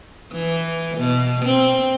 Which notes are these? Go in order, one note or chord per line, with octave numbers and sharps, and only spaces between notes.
E3
B2
C4